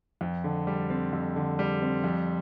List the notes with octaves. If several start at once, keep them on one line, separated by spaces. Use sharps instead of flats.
F2
D3
G3
C4
F2
D3
G3
C4
F2